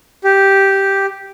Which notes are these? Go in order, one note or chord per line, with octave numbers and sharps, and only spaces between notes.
G4